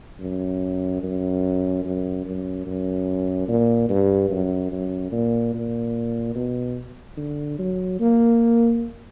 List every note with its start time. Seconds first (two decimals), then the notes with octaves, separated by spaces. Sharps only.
0.20 F#2
1.03 F#2
1.84 F#2
2.25 F#2
2.66 F#2
3.48 A#2
3.89 G2
4.30 F#2
4.72 F#2
5.12 A#2
5.54 A#2
6.35 B2
7.17 D3
7.59 F#3
8.00 A#3